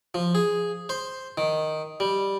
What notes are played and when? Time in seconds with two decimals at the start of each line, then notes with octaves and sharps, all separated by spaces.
0.14 F3
0.35 G#4
0.89 C5
1.38 D#3
2.00 G3